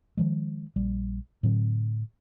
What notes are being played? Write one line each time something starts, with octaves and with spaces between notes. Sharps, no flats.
D#3 F3 G#3
A#1 G3
A2 D3 F#3 C4